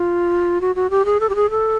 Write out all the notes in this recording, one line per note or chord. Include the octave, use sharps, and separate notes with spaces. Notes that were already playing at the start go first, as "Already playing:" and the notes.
Already playing: F4
F#4
F#4
G4
G#4
A4
G4
G#4
A4